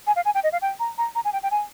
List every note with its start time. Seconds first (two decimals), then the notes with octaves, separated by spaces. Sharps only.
0.07 G#5
0.16 F5
0.25 G#5
0.35 G5
0.44 D#5
0.52 F5
0.62 G5
0.80 A#5
0.98 A#5
1.15 A#5
1.25 G#5
1.33 G5
1.43 G5
1.51 G#5